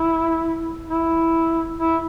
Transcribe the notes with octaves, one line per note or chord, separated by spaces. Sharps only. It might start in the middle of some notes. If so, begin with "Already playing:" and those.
Already playing: E4
E4
E4